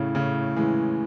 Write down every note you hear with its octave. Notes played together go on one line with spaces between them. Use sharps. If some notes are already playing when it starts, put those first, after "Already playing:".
Already playing: A2 C#3
A2 C#3
E3 G#3